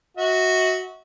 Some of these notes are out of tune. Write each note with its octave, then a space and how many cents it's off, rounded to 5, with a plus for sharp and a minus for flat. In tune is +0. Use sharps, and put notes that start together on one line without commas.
F#4 +0 E5 -45